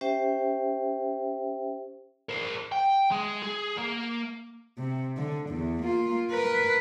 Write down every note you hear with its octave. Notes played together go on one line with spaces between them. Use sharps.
C#4 G4 C5 E5 G5
A#4 C5
G5
G#3
G#4
A#3
C3
D3
E2
A#3 F4
A#4 B4